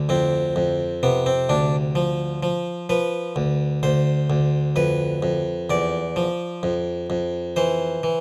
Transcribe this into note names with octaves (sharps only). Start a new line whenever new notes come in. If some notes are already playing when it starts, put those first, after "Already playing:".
Already playing: D2 D3
F2 C4
F2
C3 B3
C4
D2 D4
F3
F3
F3 B4
D2
D2 C5
D2
F2 B4
F2
E2 D5
F3
F2
F2
E3 C5
E3